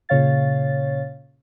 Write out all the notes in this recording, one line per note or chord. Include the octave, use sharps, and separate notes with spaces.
A#2 C#3 C#5 F5 A6